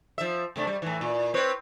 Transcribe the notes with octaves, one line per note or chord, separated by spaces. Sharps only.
F3 E5
C3 A3 D4
G3
A2 E3
A#2
C4 B4 C#5